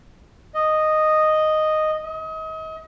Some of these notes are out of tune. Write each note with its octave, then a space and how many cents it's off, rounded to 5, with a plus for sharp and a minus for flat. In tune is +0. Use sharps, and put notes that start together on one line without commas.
D#5 -5
D#5 +35